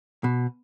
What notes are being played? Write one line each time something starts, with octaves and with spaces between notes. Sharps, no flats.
B2